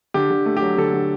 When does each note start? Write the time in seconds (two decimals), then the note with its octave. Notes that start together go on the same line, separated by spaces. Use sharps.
0.14 D3 G4
0.30 D3
0.46 A3
0.57 G4
0.62 F#3
0.78 D3 A4
0.94 D3